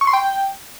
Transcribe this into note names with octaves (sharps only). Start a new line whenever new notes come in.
C#6
C6
G5